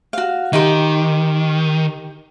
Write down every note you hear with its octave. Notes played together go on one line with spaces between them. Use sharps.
F#4 F5
D#3 D#4 G4 C6